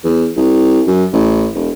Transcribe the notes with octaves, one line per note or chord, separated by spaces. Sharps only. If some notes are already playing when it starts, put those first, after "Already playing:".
E2
C2
F#2
A1
E1